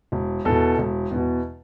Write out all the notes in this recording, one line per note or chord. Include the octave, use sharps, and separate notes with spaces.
E1
E2 B2 A4
E1
E2 B2